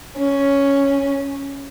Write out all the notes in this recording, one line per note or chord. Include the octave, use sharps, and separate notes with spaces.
C#4